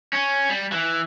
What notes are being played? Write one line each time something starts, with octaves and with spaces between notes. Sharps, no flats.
C#4
G3
E3